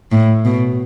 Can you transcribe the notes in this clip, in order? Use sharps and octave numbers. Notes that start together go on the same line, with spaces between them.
A2
B2